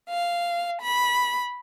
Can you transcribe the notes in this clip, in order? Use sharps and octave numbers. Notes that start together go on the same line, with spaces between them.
F5
B5